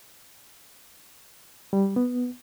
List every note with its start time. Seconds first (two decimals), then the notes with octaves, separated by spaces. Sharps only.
1.73 G3
1.96 B3